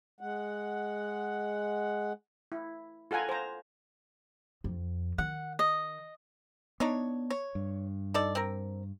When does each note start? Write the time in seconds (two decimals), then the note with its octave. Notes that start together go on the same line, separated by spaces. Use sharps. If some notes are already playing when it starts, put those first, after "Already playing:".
0.21 G#3 F#5
2.52 E4
3.11 F4 A4 F#5 G#5 A#5
3.29 C5 A#5
4.64 F2
5.18 D#3 F#5
5.59 D#5
6.80 B3 D4 D#4 C#5
7.30 C#5
7.55 G2
8.14 D#4 A4 D5
8.35 C4 A#4